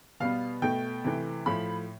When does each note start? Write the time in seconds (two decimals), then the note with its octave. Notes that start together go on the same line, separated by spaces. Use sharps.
0.20 B2 G3 B3 F5
0.62 B2 A3 G5
1.04 C3 E3 A3
1.46 A2 F3 A3 B5